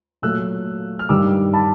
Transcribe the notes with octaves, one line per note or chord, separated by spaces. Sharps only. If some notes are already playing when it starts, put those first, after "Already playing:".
A#2 F#3 A3 E6 F#6
F6
G2 D#3 G3 D6 E6
A5 B5